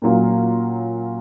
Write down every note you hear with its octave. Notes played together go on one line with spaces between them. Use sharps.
A#2 F#3 A#3 C#4 F4